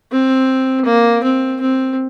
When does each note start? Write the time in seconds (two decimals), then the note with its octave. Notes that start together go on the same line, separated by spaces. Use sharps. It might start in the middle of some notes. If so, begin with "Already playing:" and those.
0.12 C4
0.86 A#3
1.23 C4
1.61 C4